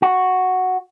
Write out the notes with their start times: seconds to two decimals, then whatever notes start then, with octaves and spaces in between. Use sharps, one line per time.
0.02 F#4